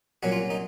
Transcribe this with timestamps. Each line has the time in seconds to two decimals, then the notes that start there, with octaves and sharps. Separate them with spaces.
0.23 C2 A#2 F#3 C#4 F#4
0.32 F4
0.50 D#4